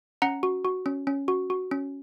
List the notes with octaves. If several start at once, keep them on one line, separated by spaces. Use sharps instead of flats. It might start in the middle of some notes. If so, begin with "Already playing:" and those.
C#4 F#5 A#5
F#4
F#4
C#4
C#4
F#4
F#4
C#4